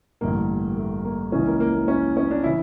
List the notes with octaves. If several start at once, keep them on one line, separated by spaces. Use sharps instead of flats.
A1 G2 D3 A#3
A3
A#3
C#2 C#3 E3 C#4
A#3
A#3
A#3
C#4
C#4
D4
C#3 E3 E4